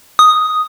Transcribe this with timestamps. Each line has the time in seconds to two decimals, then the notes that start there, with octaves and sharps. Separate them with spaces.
0.19 D#6